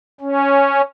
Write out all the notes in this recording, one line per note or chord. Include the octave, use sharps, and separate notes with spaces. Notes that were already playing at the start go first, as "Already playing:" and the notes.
C#4